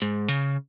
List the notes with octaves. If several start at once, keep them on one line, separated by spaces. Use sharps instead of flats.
G#2
C#3